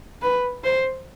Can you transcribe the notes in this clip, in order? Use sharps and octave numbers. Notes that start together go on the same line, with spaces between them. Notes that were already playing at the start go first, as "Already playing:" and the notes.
B4
C5